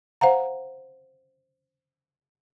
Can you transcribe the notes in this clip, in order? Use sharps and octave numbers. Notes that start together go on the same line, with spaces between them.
C5 F5 F#5 A#5